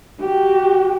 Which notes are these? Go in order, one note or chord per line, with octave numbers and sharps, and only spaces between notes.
F#4 G4